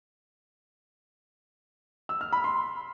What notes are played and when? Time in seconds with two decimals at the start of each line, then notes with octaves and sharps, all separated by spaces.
2.09 E6
2.21 F6
2.32 B5
2.44 C6